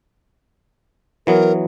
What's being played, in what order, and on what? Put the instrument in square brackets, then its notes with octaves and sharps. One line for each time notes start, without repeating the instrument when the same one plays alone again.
[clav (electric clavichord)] E3 F#3 B3 [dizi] A#4